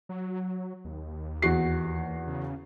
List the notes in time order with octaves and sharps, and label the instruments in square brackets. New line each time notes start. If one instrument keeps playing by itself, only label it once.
[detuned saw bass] F#3
D#2
[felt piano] E2 F#4 C7
[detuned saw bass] C#3